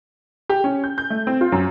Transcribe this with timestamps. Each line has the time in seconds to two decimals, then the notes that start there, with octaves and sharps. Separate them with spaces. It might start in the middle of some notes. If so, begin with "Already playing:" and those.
0.49 G4
0.64 C#4
0.84 G6
0.98 G6
1.10 A3
1.27 C4
1.41 F4
1.52 F#2